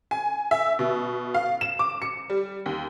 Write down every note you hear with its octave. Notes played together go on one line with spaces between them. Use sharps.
G#5
E5
B2
F5
E7
D6
C#7
G3
D#2